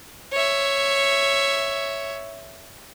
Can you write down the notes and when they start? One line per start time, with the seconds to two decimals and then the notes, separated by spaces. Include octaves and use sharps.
0.32 C#5 E5